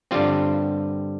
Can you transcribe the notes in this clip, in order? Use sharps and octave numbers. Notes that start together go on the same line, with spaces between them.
G2 D3 G3 C4 F4